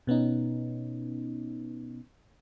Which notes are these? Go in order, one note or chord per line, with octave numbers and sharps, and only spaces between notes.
B2 B3 C#4 D#4